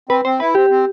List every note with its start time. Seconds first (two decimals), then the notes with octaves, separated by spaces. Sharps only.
0.09 C4 B4
0.25 C4 C5
0.40 E4 B4
0.55 C4 G4
0.70 C4